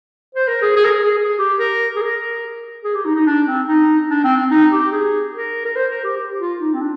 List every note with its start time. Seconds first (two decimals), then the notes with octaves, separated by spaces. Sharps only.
0.35 C5
0.48 A#4
0.62 G#4
0.76 G#4
0.84 A#4
0.90 G#4
1.04 G#4
1.17 G#4
1.38 G4
1.59 A#4
1.96 G#4
2.01 A#4
2.84 G#4
2.94 G4
3.05 D#4
3.15 D#4
3.26 D4
3.47 C4
3.67 D#4
4.10 D4
4.24 C4
4.37 C4
4.51 D#4
4.72 G4
4.93 G#4
5.35 A#4
5.65 A#4
5.76 C5
5.90 A#4
6.04 G4
6.17 G4
6.39 F4
6.60 D#4
6.73 C4
6.80 D4